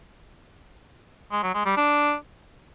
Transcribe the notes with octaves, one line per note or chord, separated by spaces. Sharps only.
G#3
F#3
G#3
G3
D4